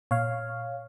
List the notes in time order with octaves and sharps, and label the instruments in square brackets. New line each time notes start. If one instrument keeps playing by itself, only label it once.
[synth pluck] A#2 [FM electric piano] C#5 F5